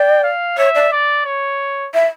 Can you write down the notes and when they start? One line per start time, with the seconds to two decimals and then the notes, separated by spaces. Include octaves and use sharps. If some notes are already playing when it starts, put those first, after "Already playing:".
Already playing: D5 G5
0.23 F5
0.58 C#5 E5
0.75 D5
0.92 D5
1.26 C#5
1.94 E5